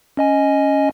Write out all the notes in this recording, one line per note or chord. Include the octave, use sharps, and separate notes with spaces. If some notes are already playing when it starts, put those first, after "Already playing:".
C#4 D#5 G#5